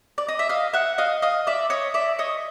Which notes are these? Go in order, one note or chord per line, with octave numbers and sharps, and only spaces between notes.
D5
D#5
E5
D#5 F5
E5 F#5
D#5 F5
D#5 F5
D5 E5
C#5 D#5
D5 E5
C#5 D#5